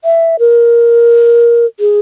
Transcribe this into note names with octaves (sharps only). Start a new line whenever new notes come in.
E5
A#4
G#4